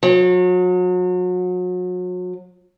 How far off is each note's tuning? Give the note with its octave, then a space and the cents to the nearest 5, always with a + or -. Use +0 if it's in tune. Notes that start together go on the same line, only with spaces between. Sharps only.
F#3 -35